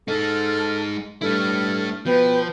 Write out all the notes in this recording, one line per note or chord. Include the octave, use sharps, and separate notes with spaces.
G#3 D#4 A4 F6
G2 A3 E4 A4 F6
B2 F3 B4 G5 B5 G6